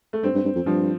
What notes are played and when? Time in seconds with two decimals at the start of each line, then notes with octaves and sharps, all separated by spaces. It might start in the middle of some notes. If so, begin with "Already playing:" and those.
0.13 A3
0.23 G2 C4
0.34 G2
0.45 G2
0.55 F2
0.66 G2 F3